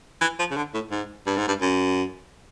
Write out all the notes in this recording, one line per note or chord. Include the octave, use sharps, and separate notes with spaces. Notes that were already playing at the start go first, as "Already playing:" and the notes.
E3
F3
C#3
D3
A2
G#2
G2
G#2
G2
F#2